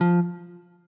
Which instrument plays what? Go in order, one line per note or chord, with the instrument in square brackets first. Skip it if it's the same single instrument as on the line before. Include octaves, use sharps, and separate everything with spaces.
[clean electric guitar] F3